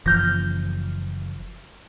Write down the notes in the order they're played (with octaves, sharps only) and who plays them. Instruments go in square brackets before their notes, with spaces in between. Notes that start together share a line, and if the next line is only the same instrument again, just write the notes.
[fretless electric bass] F#1 E3 F3 [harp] F6 G6 A#6